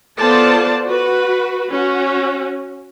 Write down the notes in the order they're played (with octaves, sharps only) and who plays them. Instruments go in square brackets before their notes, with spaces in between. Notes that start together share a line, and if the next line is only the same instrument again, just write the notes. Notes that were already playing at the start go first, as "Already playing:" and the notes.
[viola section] B3 F4 A4 C5 D5 A5
F#4 B4
C#4 F#4